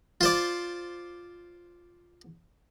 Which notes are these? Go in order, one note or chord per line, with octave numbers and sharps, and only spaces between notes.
F4 C5 D5